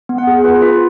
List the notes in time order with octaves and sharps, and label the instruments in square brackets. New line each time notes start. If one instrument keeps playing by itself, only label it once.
[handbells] B3
F#5
G#4
F4 B4
F4 B4